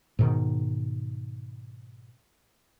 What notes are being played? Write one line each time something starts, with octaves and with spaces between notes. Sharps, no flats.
G#2 B2 D#3